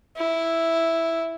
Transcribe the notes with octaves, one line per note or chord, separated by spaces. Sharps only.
E4